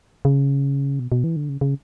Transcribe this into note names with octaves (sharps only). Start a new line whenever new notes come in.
C#3
B2
B2
E3
D3
C#3
C#3